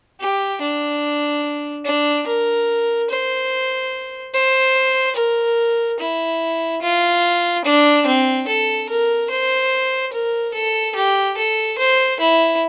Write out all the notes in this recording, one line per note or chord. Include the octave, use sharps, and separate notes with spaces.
G4
D4
D4
A#4
C5
C5
A#4
E4
F4
D4
C4
A4
A#4
C5
A#4
A4
G4
A4
C5
E4